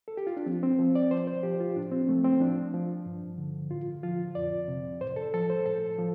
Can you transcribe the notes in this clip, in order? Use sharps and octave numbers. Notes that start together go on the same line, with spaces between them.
A4
G4
F4
D4
F3 C4
C4
F3 C5
D5
F3 C5
C5
F3 G4
F4
A2 D4
C4
F3 A3
C4
F3 D4
F3
G2
D3
A2 F4
F3 F4
F2 D5
C3
A2 C5
A4
F3 A4
C5
A2 A4
F3